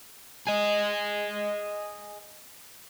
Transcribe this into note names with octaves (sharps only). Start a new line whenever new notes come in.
G#4 D#5